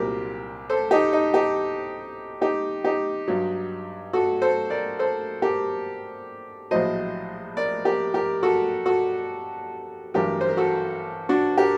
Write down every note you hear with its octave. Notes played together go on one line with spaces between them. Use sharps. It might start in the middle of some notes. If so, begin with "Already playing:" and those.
Already playing: C2 A#2 F#3 G4 A#4
A4 C5
D#4 G4
D#4
D#4 G4
D#4 G4
D#4 G4
G2 F#3
F#4 A4
A4 C5
A#4 D5
A4 C5
G4 A#4
A#1 A2 F#3 C5 D#5
A#4 D5
G4 A#4
G4 A#4
F#4 A4
F#4 A4
A1 G2 F#3 G4 A#4
C5
A#4
F#4 A4
D4 F#4
G4 A#4